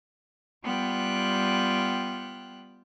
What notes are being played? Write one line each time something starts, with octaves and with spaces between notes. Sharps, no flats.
G3 B3 F4 G5 F#6